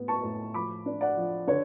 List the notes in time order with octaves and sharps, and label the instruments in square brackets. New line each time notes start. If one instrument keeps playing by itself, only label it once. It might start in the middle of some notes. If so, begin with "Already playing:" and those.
Already playing: [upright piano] A2 B3
A5 C#6
A2
F3 B5 D6
D4
D5 F#5
F3
D3 C#5